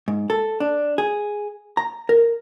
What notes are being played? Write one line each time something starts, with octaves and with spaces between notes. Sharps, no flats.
G#2
A4
D4
G#4
A#5
A#4